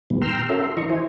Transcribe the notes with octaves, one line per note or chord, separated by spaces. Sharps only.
A#2 D#3 G3 B3
G5 A#5 C6 E6 F6
C#4 F#4 A4 A#4 E5
C6
E3 D#5 A#5 C#6
E4 C5 G#5